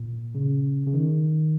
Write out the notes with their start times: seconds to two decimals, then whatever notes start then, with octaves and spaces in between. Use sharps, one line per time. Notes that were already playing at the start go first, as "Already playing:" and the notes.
Already playing: A#2
0.35 C#3
0.86 C#3
0.94 D#3